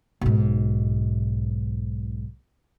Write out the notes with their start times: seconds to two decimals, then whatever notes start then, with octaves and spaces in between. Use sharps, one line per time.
0.21 B1 G#2